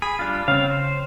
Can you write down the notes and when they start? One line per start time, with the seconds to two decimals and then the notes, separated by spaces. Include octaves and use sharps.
0.02 G#4 B5
0.19 G3 D4 F4
0.48 C#3 C4 F5
0.71 C5